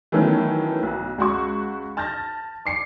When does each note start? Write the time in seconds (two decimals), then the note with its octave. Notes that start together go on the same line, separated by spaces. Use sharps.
0.12 D#3 E3 F#3 A3 B3 C#4
0.83 B1
1.18 C#2 F#4 C#6
1.97 A5 F6 G6 A6 A#6
2.66 D6 C7 C#7